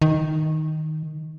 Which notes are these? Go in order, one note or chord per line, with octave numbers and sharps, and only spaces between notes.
D#3